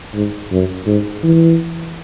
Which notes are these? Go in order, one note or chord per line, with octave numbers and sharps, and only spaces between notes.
G#2
F#2
G#2
E3